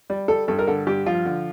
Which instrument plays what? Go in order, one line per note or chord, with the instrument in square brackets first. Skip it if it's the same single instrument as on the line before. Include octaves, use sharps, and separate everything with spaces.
[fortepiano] G3
G3 A4
G2 A4
A#4
D3 A4
G2 G4
F3 F4
D3